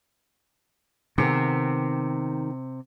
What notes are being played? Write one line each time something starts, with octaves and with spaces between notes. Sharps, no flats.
C3 D#3 B3 G#4